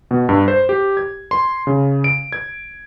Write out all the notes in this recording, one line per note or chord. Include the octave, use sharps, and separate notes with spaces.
B2
G2
C5
G4
G#6
C6
C#3
D7
G#6